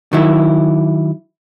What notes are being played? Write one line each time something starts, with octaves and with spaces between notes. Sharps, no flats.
D#3 F#3 E4